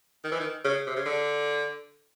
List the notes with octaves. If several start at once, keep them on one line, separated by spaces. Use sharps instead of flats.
D#3
E3
D#3
C#3
C3
C#3
D3